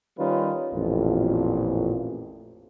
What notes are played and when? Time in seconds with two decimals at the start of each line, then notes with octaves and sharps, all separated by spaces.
0.18 D#3 G3 C#4 D#4 F4 B4
0.73 A1 F2 A#2